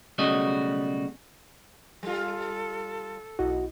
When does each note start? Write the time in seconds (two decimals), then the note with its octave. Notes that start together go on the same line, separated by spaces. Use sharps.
0.18 B1 C#3 G3 A3 F#4 D#5
2.03 G3 F4 A4
3.39 B1 E4 F#4 D#5